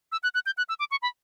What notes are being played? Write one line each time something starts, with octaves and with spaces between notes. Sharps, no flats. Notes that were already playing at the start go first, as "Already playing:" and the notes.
E6
F#6
F#6
G6
F#6
E6
D6
C#6
B5